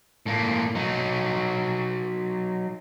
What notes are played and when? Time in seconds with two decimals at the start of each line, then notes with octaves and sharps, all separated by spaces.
0.26 A2 A#3
0.75 F#3 D#4